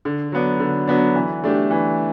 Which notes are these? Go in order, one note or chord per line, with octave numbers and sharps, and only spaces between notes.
D3
F#3 B3 D4
D3
F#3 B3 D4
E3
A3 D4 G4
E3